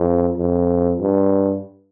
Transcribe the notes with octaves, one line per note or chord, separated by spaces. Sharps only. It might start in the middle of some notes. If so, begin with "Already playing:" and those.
Already playing: F2
F2
G2